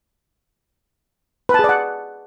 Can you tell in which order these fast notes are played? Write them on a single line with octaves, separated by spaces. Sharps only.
B4 A5 G#4 D5 F#5